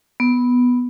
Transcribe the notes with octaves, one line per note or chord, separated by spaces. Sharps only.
B3